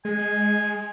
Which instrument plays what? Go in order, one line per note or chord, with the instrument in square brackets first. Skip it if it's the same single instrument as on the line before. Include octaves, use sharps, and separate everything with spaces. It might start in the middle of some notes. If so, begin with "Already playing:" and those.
[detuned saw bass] G#3 [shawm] G#5